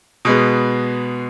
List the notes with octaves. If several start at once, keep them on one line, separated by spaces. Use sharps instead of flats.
B2 G#3 B3